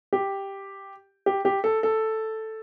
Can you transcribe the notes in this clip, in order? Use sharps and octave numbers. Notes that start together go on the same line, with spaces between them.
G4
G4
G4
A4
A4